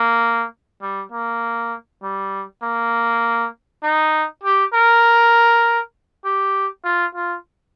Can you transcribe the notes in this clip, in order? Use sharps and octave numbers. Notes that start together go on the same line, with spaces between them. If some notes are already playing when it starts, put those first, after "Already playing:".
Already playing: A#3
G3
A#3
G3
A#3
D#4
G4
A#4
G4
F4
F4